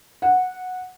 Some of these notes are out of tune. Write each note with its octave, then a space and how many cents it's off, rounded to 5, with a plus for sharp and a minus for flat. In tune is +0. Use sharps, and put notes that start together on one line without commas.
F#5 -10